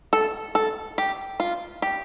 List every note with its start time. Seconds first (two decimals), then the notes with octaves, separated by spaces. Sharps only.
0.13 A4
0.55 A4
0.98 G4
1.40 F4
1.82 G4